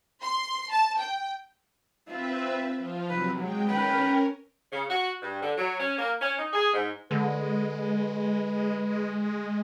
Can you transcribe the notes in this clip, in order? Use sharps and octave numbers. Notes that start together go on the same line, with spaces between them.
C6
A5
G5
C4 F4 B4 E5
F3 F4
C3 F#3 B4
F#3 G#3 G5
C#4 A#4 B4 G5
C#3
F#4
G2
D3
F#3
C#4
A#3
C#4
D#4
G#4
G#2
D3 G#3 B4